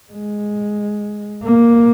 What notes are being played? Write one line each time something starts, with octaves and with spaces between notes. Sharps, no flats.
G#3
A#3